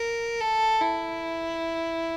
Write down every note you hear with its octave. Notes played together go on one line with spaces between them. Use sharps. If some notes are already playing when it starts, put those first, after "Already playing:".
Already playing: A#4
A4
E4